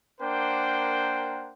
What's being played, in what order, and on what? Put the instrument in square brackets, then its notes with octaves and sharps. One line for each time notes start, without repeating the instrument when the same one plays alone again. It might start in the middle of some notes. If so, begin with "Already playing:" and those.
[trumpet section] A#3 D4 A#4 C5 F#5 G5